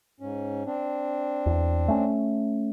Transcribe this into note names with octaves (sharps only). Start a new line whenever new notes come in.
G#2 C#4
C4 D4
E2
A3 C#4